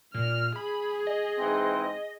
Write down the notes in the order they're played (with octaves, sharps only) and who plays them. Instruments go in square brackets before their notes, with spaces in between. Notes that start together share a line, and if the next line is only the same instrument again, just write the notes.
[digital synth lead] A#2 [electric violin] F6
[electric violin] G#4 [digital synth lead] B5
[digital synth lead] D#5
[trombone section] G#2 E3 C4